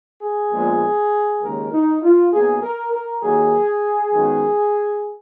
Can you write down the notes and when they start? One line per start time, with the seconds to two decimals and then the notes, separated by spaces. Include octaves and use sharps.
0.22 G#4
0.52 A#1 A#2 G#3 B3
1.42 D#2 C#3 G#3 A#4
1.71 D#4
2.02 F4
2.31 B1 B2 A#3 G#4
2.61 A#4
2.92 A#4
3.22 D#2 D#3 F#3 A#3 G#4
4.12 F#2 D#3 G#3 B3